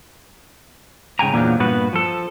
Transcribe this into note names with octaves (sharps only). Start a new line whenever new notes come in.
G#2 C#3 G5 G#5 A#5
E2 A#2 D3 F3 F#3
G2 A#2 B3 F#4 B4
F3 A4